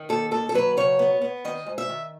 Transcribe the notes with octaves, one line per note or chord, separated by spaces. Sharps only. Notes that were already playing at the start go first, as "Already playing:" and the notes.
Already playing: D#3
D#2 A4
D#2 A4
A4
F#3 B4
C#3 C#5
B3
B3
D#3 D#5
G#2
E5
D#3